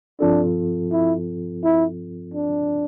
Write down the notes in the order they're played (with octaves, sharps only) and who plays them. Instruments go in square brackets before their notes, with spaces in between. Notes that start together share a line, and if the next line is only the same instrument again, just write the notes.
[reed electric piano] G2 F3 C4 F4 A4 [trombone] D4
[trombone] E4
E4
D4